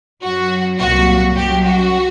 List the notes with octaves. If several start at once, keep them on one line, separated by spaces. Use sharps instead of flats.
F#2 F#3 F#4
C2 A#2 F#3 F#4
F#2 F#3 G4
F#4